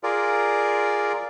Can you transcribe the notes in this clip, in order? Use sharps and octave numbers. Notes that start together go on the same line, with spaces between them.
F4 G#4 A#4 D5